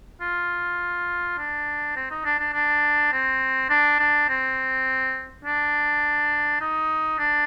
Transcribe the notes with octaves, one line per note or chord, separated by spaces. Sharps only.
F4
D4
C4
D#4
D4
D4
D4
C4
D4
D4
C4
D4
D#4
D4